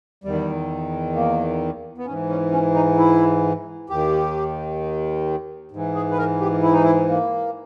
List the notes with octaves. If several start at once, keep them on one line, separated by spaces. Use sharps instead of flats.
E2 D#3 G3
A#3
B3
G#2 E3 C#4
C#4
C#4
D#4
E4
D#2 D#3 G4
G#2 E3
G#4
B4
A#4
G4
E4
D#4
E4
A#3